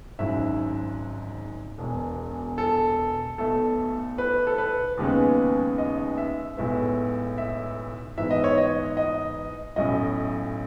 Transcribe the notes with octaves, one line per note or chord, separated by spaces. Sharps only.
G#1 G#2 F#3 C#4 E4 E5
E1 E2 B2
A4
B1 B2 A3 A4
B4
A4
B4
D#2 C#3 G#3 B3 D#4
D#5
E5
B1 A2 G#3 B3 E5
E5
G#2 E3 B3 E4 E5
D#5
C#5
D#5
D#5
B1 A2 F#3 C#4 E4 D#5